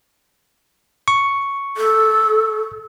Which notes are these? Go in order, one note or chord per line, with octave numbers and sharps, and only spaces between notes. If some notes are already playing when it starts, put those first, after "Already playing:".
C#6
A4